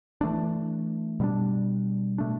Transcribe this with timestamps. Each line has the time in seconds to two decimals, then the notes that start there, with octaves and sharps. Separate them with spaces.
0.21 E3 A3 D4
1.20 B2 G3 B3 D4
2.18 B2 A3 D4